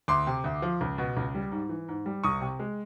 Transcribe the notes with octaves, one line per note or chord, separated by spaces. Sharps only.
D2 C6 D6
C3
D2
F3
C#2
B2
C#2
G3
G#2
E3
G#2
G3
C2 C#6 D#6
C3
G#3